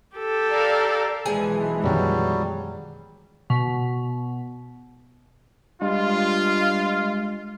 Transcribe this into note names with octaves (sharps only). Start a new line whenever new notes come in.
G4 A4
A#4 D5 F5
B1 E3 F3 G#3 G#4 G#5
F#2 B2 D#3 F#3 G3
B2
G2 G#3 F4